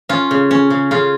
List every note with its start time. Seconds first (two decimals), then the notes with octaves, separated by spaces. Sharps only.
0.09 C#4 F4
0.31 C#3
0.51 C#4
0.70 C#3
0.91 C#3 F4